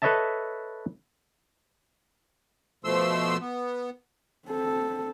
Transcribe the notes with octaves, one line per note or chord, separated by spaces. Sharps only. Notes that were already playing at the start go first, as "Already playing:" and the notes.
A4 B4 C#5 D#5 E5 A5
B2 F3 A3 C6 E6
B3
C4 A4